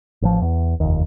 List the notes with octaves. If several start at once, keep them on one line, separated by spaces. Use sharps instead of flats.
A1 F3
E2
F1 D#2